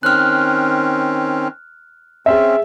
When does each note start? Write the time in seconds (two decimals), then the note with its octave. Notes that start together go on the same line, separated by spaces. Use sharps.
0.03 D#3 C4 C#4 F6 F#6
2.26 C4 C#4 G#4 E5